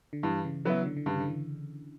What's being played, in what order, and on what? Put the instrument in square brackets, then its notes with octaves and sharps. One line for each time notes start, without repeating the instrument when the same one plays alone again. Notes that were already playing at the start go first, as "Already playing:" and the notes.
[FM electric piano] D3
[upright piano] G2 [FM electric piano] E3
[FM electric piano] C#3
[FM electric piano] C#3 [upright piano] F#3 B3 E4
[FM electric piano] D3
D3
[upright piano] G2 [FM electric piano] C#3
[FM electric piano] D3
E3